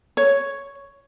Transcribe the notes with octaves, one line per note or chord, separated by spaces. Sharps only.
C#5